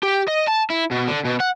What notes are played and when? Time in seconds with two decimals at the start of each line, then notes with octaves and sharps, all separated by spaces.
0.03 G4
0.28 D#5
0.47 A5
0.70 E4
0.91 B2
1.08 D3
1.25 B2
1.40 F#5